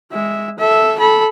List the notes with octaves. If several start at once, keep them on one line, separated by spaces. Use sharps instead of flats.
G#3 E5
A4 E5
A4 B5